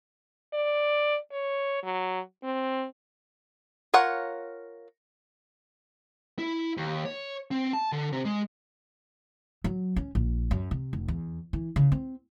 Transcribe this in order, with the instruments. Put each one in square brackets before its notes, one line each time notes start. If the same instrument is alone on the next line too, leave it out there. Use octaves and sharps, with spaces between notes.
[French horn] D5
C#5
F#3
C4
[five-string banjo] F4 A#4 C#5 F#5
[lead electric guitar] E4
D#2
C#5
C4
A5
D3
C3
G#3
[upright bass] F#3
C#4
A#1
F#2
C3
F1
E2
E3
C#3
C4